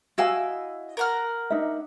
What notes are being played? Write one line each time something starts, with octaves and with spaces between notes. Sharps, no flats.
E4 F#4 D#5 F5 G#5 E6
A#4 F#5 F6
D4 D#4 E5